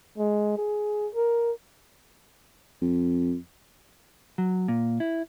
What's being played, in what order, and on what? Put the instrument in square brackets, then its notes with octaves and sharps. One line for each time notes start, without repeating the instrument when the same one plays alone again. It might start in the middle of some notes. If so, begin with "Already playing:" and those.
[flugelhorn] G#3
G#4
A#4
[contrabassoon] F2
[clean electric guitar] F#3
A#2
E4